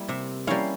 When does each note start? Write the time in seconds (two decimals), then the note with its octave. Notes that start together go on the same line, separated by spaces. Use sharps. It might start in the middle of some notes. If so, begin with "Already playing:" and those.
Already playing: G3 A#3 E4
0.08 C3 E5
0.47 G3 A#3 C#4 E4 F5